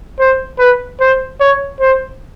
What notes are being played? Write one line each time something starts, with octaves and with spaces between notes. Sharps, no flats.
C5
B4
C5
C#5
C5